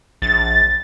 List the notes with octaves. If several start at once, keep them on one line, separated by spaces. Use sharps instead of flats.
A#1 A6